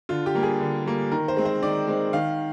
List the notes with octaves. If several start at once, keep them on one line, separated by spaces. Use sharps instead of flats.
D3 F4
G4
G3 A#3
G#4
D3
G3 A#3
D#3 A#4
C5
G#3 C4
C5
D#3 D5
G#3 C4
D#3 F5